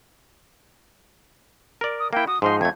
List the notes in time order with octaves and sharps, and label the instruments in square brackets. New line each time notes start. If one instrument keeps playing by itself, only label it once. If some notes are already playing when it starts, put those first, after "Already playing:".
[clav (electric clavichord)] A#4 D5
[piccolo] D#6
[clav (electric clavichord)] A#3 E4 [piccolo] G5
[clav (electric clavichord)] F#4 [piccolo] D#6
[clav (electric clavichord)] G#2 F3 D#4 [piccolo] C6
[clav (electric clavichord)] F2 A3 [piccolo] G#6